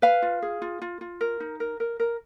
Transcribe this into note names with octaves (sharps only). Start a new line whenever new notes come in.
B4 F5
F4
G#4
F4
F4
F4
A#4
D#4
A#4
A#4
A#4